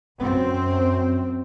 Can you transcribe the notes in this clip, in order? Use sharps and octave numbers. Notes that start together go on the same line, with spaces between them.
F#2 C4